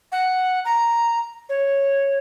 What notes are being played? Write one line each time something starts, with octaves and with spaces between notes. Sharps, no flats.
F#5
A#5
C#5